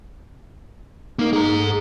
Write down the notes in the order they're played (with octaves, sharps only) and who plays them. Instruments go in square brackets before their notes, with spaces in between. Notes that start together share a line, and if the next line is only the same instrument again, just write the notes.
[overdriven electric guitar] A#3 A#4 [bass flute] D#4
[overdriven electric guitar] G#4 A#5
[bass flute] A4